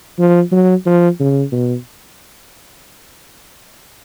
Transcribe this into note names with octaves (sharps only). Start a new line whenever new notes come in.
F3
F#3
F3
C#3
B2